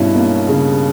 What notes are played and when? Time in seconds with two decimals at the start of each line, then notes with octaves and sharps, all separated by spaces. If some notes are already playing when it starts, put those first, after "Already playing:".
Already playing: G2 B2 C#4 E4
0.15 A#3
0.48 C#3